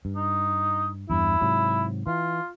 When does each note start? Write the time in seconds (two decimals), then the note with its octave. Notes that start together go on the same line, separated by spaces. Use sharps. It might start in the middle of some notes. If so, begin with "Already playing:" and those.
0.05 G2
0.16 D#4
1.10 E2 G2 E4
1.41 G#2 C3 F#3
2.07 E3 F4